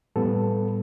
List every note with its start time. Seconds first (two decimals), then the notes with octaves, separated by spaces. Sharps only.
0.16 A2 G3 B3 A4